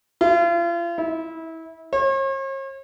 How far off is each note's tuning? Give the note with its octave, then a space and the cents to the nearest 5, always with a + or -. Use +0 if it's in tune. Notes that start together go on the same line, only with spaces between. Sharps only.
F4 -40
E4 -25
C#5 -45